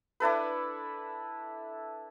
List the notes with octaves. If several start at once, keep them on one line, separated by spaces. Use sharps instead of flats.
D4 E4 A4 B4